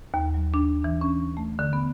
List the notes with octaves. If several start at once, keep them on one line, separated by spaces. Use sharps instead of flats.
D#2
F#3
D4
E3
C#4
A3
D3
B3